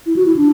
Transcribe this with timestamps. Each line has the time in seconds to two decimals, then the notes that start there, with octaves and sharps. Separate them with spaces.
0.06 E4
0.16 F#4
0.26 E4
0.36 D4